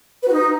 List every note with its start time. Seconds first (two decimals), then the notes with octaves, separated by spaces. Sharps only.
0.22 B4
0.27 F#4
0.32 D#4